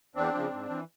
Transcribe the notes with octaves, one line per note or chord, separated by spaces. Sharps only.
E2 C4 D4
C#3 F3
G#2
E3